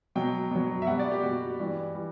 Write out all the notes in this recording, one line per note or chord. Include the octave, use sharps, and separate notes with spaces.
B2 F#3 G5
B2 F#3
E5
B2 G3 F#5
D5
G4
B2 G3 F#4
G2 E3 G3
E3 G3